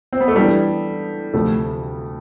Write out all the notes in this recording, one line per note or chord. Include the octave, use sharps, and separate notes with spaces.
C4
B3
A3
E3 G3 B3 D4 A4
D2 C3 F3 A3